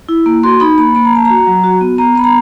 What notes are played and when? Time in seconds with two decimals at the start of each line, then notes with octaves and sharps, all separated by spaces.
0.09 E4
0.26 A#3
0.43 F#4 C6
0.60 D#4 B5
0.78 A#3 B5
0.95 A#3 B5
1.05 A#5
1.13 A#3 A5
1.25 F#4 A#5
1.47 F#3
1.64 F#4
1.81 B3
1.98 B3 A#5
2.15 B3 B5
2.24 A#5